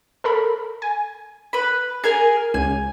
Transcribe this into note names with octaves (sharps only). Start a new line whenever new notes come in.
A4 A#4 B5
G#5
B4 B5
G#4 A#4 G#5 G#6
C#2 G#5